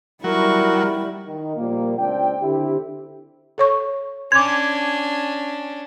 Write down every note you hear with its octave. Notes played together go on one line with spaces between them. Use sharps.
F#3 G3 E4 A#4 C#6
D#3
A#2 F3 G3 A#3
C#2 C4 D4 G5
D3 C4 E4 G4
A4 C#5 C#6
C#4 D4 C6 D6 G#6